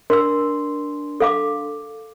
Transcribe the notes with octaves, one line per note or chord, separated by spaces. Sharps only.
D4 A#4 C6 E6
A4 F5 D6